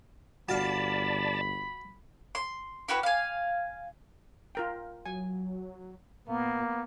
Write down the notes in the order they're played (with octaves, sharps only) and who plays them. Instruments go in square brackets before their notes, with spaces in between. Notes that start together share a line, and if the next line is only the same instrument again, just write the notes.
[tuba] G1 [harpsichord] F#4 F5 [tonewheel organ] D5 A5 [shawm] B5
[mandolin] C6
E4 F#4 G4 B4
F5 G#5
[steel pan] F4 A#4 G5
[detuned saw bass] F#3 [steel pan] G#5
[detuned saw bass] A#2 [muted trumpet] A#3 [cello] B3